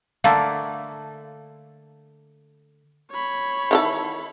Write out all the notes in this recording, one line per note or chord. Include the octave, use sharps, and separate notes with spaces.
D3 A3 A#3 F5
C#5 B5
D#3 E3 A4